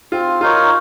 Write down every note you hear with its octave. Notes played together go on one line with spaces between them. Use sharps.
C4 F4
D#4 F4 A#4 C#5